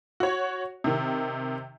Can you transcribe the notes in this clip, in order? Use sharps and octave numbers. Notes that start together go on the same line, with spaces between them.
F#4 C#5
C3 D#3